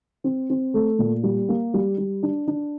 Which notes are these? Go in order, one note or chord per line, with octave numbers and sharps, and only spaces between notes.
C4
C4
A3
A#2
G3
A#3
G3
G3
D4
D4